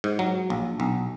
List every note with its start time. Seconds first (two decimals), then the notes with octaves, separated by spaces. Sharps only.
0.04 G#2
0.19 F#3
0.50 A#1
0.80 B1